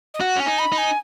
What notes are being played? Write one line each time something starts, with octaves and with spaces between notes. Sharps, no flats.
D#5
F#4 F#5
C#4 G#5
D#4
B5
D#4
G#5